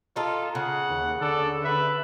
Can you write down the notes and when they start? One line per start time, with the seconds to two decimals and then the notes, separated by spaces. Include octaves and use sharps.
0.16 D#4 F4 A4
0.55 C#3 F#5
0.90 D#2
1.21 D3 A4 D5
1.63 B4 E5